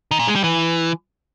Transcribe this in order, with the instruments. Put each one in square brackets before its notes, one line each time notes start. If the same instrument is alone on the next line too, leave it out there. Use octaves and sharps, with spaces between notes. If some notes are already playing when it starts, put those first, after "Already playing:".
[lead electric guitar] D#3
A#2
G#3
G3
E3